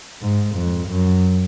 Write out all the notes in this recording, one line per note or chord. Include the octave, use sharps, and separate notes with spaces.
G#2
F2
F#2